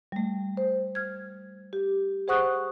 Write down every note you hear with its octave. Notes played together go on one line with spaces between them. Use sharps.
G3 A3
C5
F6 G#6
G4
G#4 C5 F#5 C#6 D#6 F#6